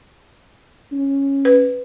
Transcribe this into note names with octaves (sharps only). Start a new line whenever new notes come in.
C#4
B4